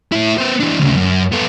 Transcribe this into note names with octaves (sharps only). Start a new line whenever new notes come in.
A2 E4
B3 C5
E3 D4
D2 C#3
F#2
B3 A4